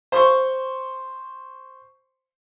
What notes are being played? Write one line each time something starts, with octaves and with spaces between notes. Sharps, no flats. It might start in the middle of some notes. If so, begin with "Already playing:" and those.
C5 C6 C#6